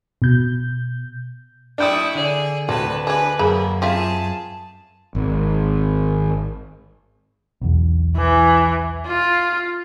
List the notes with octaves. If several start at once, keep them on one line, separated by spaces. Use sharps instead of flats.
B2 G6
D4 E4 G5 C#6 D#6
D3 G#4 D5
D2 C4 B4 A5
D4 G#4 B4
F#2 A#3 G#4 B5
C4 F4 G#4 E5 A5
G#1
B1 E2
E3
F4